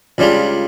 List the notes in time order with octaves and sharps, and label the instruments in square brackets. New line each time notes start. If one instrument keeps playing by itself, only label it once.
[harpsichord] C#2 C#3 G3 D4 F4